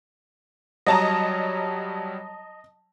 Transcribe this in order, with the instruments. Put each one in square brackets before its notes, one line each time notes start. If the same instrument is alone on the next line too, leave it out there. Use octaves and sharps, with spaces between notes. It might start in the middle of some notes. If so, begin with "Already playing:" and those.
[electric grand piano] F#3 G3 C#5 [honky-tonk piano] D#5 A5 A#5